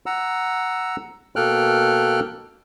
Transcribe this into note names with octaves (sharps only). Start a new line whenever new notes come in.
F#5 A#5 E6
B2 A#3 A4 G5 F6 F#6